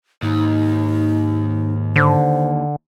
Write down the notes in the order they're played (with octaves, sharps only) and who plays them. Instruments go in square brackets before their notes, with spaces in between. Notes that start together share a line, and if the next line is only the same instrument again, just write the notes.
[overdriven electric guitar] D#2 [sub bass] G#2 [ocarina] D#4
[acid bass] D3 [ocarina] C5